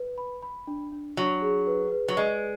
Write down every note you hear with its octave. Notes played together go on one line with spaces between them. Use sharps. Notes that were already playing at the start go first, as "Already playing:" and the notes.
Already playing: B4
B5
B5
D4
D4
F#3 D4
G#4
B4
B4
F#3
G#3 D5